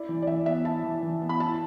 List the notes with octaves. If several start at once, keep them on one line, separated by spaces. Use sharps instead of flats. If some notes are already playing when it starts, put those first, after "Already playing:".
Already playing: E4 D5
E3
D5
E3 E5
B3 E5
E4 A5
E3
E3
B3
B5
E4 A5